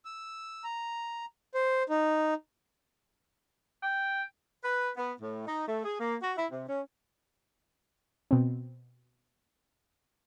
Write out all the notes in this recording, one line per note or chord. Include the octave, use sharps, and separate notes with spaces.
E6
A#5
C5
D#4
G5
B4
B3
A2
D#4
A3
G#4
A#3
F#4
E4
C3
C#4
B2 C4